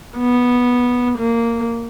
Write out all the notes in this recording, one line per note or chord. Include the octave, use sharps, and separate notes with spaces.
B3
A#3